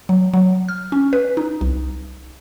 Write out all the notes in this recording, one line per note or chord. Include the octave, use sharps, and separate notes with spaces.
F#3
F#3
F6
C#4
B4
D#4
C2